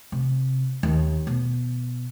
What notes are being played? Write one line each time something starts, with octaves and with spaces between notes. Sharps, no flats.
C3
D#2
B2